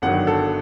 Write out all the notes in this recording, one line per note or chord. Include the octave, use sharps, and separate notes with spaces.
G1 G2 D#3 F#3 F#5
A4